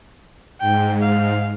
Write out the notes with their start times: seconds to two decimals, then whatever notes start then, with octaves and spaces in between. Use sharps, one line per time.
0.61 G#2 G5
1.02 F5